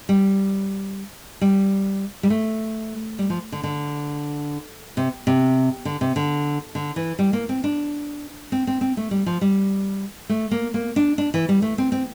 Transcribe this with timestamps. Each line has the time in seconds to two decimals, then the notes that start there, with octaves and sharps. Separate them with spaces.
0.09 G3
1.41 G3
2.23 G3
2.30 A3
3.19 G3
3.30 F3
3.52 D3
3.64 D3
4.97 C3
5.27 C3
5.85 D3
6.01 C3
6.16 D3
6.75 D3
6.96 E3
7.19 G3
7.33 A#3
7.49 C4
7.64 D4
8.52 C4
8.67 C4
8.81 C4
8.97 A3
9.11 G3
9.26 F3
9.41 G3
10.29 A3
10.51 A#3
10.74 A#3
10.96 D4
11.18 D4
11.34 E3
11.49 G3
11.62 A3
11.78 C4
11.92 C4